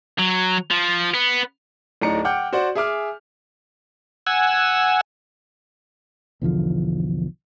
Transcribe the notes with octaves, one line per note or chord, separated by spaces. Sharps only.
F#3
F3
B3
D1 A2 D#4 D5 A#5 C#7
F#5 G5 D6 F6 G6
F#4 C5 D5 F#5
G#4 E5 G#5 D6 F6
F#5 G#5 E6
B1 E2 D3 F3